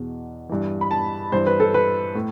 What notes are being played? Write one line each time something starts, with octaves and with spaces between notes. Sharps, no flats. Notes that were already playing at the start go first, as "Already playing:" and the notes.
Already playing: E2 B2
G2 E3
B5
A5
G2 E3 C5
B4
A4
B4
A2